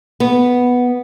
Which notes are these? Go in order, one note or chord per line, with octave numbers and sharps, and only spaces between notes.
B3